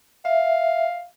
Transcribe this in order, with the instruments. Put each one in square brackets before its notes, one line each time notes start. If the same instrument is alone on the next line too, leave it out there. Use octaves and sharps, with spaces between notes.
[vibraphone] E5 [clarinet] F5